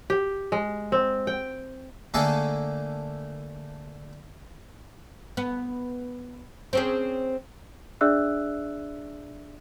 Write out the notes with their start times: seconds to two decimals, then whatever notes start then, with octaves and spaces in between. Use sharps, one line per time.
0.10 G4
0.52 G#3
0.92 C4
1.27 G5
2.14 D3 A3 A#3 G#4 A4
5.37 B3
6.73 C4 C#4 G#4
8.01 D4 G#4 D5 E5 E6 F#6